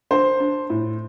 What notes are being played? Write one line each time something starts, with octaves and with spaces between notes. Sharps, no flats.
D4 C5
D4
A2